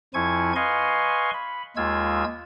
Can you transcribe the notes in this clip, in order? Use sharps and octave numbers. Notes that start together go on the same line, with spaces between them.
F2 F3 E4 G#5 C#6 G#6
B4 D#5 F5 G#5 C6 C#6
B5
D#2 G#3 F4 E6 G#6